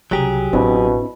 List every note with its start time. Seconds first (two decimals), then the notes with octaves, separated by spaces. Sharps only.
0.11 C2 C#3 F#3 G4 G#4 A#5
0.53 A1 B2 C4 D4 E4